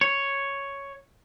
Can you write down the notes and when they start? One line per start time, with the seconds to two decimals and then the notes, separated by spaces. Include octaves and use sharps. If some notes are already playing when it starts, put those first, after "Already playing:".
0.01 C#5